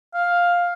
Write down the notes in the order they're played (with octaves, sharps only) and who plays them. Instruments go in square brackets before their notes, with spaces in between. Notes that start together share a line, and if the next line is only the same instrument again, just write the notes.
[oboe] F5